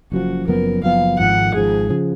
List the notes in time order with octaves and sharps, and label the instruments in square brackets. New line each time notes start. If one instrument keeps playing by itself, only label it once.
[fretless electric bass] F#1 F#2 F3 [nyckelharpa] F#4
[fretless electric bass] F#1 F#2 F3 B3 [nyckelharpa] A#4
[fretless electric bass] F#1 F#2 F3 B3 [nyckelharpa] F5
[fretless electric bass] G#1 G#2 F3 [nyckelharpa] F#5
[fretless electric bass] G#1 G#2 F3 [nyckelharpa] G#4
[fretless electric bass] C#3 F3